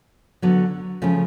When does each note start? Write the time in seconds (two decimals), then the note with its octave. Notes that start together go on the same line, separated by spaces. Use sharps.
0.42 D3 F#3 B3
1.02 C#3 F3 A3 C#4